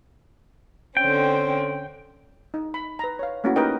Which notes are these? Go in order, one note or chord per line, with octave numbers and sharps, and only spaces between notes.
D3 C4 C#4 G5
D#4
B5
B4 A#5
C#5 F5
A3 A#3 C#4 E4 F#4
D#4 G4 A#4 B4 D#5 G5